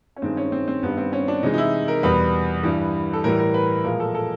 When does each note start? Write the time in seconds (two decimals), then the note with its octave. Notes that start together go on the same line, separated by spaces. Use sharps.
0.16 C#4
0.22 G2 D#3 G#3 C4
0.37 C#4
0.52 C4
0.68 C4
0.83 G2 D#3 G3 B3
0.97 C4
1.13 C#4
1.28 D4
1.43 C3 E3 G#3 D#4
1.54 D#4
1.58 E4
1.88 A#4
2.03 E2 B2 G3 B4
2.63 G2 E3 G3
3.13 A4
3.24 A2 E3 G3 A#4
3.39 A#4
3.54 B4
3.84 A#2 F3 G#3 A#4
4.00 A4
4.15 A4